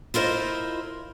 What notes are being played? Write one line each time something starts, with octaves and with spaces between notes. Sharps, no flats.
E4 F4 A#4 C5 D#5